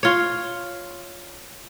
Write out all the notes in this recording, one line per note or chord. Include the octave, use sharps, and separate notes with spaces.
F4 C#5